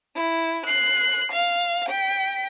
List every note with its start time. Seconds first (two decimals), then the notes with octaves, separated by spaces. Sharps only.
0.15 E4
0.66 F#6 C7
1.32 F5
1.88 G5 B6